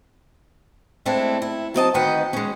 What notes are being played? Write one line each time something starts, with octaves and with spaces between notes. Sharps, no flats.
G#3 A3 C4 D4 E4
E4
F#3 C4 D#5 A5
D2 D#3 B4 D#5 F#5 G5
G#3 C#4